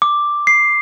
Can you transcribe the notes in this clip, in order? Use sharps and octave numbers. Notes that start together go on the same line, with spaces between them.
D6
C7